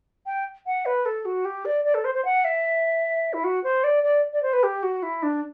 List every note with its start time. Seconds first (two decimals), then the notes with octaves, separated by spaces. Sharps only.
0.26 G5
0.66 F#5
0.85 B4
1.05 A4
1.25 F#4
1.45 G4
1.65 D5
1.85 D5
1.94 A4
2.04 C5
2.14 C5
2.24 F#5
2.44 E5
3.33 E4
3.44 F#4
3.63 C5
3.84 D5
4.03 D5
4.33 D5
4.42 C5
4.53 B4
4.63 G4
4.83 F#4
5.02 E4
5.22 D4